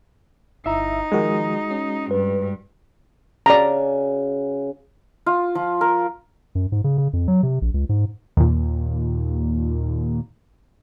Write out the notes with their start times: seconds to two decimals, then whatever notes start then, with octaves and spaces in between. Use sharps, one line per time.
0.66 G1 D#4 E4 E5 A#5
1.12 D#3 F3 G#3 F#4 A#4
1.71 C#4
2.11 G2 B4
3.46 C#3 F#4 D5 G#5 A#5
5.26 F4
5.55 F3
5.81 A#4
6.55 F#2
6.72 G#2
6.84 C#3
6.98 C#3
7.13 F2
7.28 F#3
7.43 C3
7.62 A#1
7.74 C#2
7.89 G#2
8.37 D#2 A#2